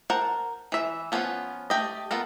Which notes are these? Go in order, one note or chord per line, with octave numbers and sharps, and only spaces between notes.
A#4 C5 F#5 A5
E3 E5
F3 B3 C#4 D4 F4
A3 G4 D#5
B3 F4 A4 A#4